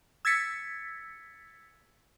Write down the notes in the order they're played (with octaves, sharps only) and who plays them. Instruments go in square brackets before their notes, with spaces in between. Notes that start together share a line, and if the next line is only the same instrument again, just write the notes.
[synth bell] E6 G#6 A6 B6 C#7